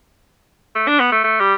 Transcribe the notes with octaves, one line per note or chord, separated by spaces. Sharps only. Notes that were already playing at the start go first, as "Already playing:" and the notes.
A3
D4
B3
A3
A3
G3